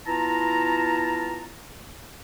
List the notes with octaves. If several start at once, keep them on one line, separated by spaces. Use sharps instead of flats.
B3 E4 F4 A5 A#5